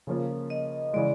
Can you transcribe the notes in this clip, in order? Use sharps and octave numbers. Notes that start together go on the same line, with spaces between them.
C#3 F3 A#3 C#4 F4
D#5
C#3 E3 G#3 D5